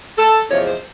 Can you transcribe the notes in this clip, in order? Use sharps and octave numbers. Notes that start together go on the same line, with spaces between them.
A4
E2 C3 F3 G#3 C#5
C5